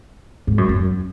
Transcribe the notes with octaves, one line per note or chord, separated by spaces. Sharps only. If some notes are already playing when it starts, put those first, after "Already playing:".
G#2
F#2
F#2